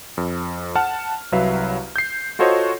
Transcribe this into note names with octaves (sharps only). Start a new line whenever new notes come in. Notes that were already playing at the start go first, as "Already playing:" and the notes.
F2
F#5 A5 F6
C2 F#3 B4 E5 F5
G6 C7
F4 F#4 A4 C5 C#5 D#5